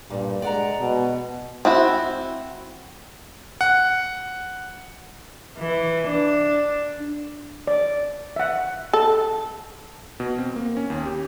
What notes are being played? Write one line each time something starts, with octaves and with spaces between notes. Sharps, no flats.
G2 A#2
G#3 D5 F#5 A#5
B2
C4 E4 F#4
F#5
E3
D4
D5
E5 F#5
A4
B2
C4
A#3
C#4
D#2
G4